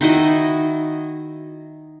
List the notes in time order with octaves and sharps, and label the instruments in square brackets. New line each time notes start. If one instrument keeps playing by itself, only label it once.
[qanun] D#3 E4 F#4 D#5